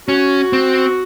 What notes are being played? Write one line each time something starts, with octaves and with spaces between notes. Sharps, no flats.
C#4 F#4
C4